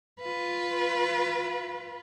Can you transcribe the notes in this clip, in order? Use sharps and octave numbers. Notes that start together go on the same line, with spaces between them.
F4 B4